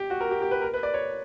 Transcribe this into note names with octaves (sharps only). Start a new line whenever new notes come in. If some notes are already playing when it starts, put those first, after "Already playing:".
Already playing: G4
F#4
A#4
G4
G4
B4
A#4
B4
D5
C#5